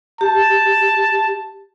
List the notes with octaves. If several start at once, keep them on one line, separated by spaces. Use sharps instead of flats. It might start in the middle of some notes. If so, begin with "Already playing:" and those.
G4 A5